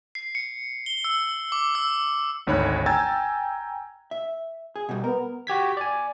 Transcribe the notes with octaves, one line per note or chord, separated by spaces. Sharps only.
C7
C#7
G7
E6
D6
E6
G#1 D2 D#4 C#5 B5 F#6
G5 G#5 A#5 E6 G#6 A6
E5
G#4
B2 G3
B3 A#4
F#4 G4 G#6 B6
D5 G#5